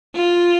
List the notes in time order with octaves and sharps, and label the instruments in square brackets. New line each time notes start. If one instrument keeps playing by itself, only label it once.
[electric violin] F4